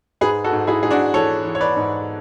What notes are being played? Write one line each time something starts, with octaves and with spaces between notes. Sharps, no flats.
G#2 G#4 B4
F#4 A4
G#2
E4 G#4
G#2 G#4
D4 F#4
E3 A4 C#5
E3
C#5
B4 D5
G#2